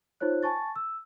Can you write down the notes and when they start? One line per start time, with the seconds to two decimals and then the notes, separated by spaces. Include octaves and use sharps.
0.20 D#4 F4 C5 C#5 F#6
0.43 G#5 A5 C#6 A6
0.76 E6